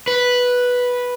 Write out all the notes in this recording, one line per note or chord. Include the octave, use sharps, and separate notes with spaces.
B4